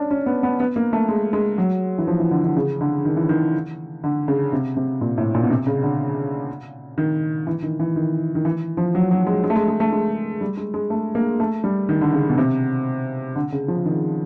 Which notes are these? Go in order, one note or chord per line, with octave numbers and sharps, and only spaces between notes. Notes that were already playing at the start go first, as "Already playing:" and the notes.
Already playing: C#4 D4
C#4
B3
B3
B3
A#3
A3
G#3
G#3
F#3
E3
F3
E3
D3
D3
C#3
D3
D#3
E3
D#3
D3
C#3
C3
C3
A#2
A2
A#2
B2
C3
C#3
D3
D#3
E3
D#3
E3
D#3
D#3
E3
F3
F#3
F#3
G#3
G#3
A3
G#3
G#3
A3
G#3
G3
G#3
G#3
A3
A#3
A3
G3
D#3
D3
C#3
B2
C3
D3
C#3
F3
D#3